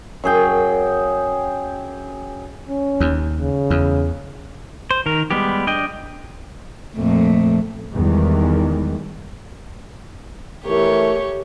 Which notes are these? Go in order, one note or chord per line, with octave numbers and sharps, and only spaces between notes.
F#2 G#4 G5
C#4
D#2
C#3
E2
C5
D#3 A#4
G3 G#3 B3 G4
D4 D#5 G5
F2 A#2 A3
E2 D#3 E3 G3 G#3
E3 A3 G4 A#4 C#5